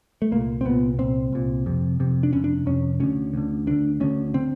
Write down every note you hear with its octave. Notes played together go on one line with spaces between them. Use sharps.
A3
C2 A#2 A#3
C4
C2 A#2 B3
C2 A#2 C4
C2 A#2
F2 C3
F2 C3
D4
F2 C3 C#4
D4
F2 C3 C#4
D2 D3 C#4
D2 D3
D2 D3 D4
D2 D3 C#4
D3 C4